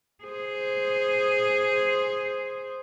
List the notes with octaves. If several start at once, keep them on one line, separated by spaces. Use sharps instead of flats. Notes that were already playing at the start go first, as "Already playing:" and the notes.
G#4 C5